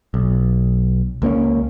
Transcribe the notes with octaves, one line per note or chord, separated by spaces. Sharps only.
B1
C#2 A#3 C4 C#4